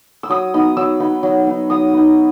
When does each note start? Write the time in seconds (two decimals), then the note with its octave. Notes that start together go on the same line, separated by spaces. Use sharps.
0.23 E6
0.30 F#3 D#6
0.54 B3 D#4
0.77 F#3 E6
1.00 B3 D#4
1.23 F#3
1.47 B3 D#4
1.70 F#3 D#6
1.94 B3 D#4